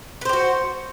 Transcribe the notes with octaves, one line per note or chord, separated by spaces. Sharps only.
F#4 G4 B4 C5